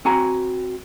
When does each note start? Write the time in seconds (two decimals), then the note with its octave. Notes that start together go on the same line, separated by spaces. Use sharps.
0.05 C4 F#4 G#5 A#5